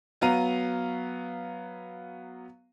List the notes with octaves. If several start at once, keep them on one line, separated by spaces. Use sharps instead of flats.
F#3 B3 F5 A#5 D#7